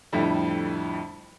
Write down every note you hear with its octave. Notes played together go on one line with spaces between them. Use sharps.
F2 A2 D3 G3 E4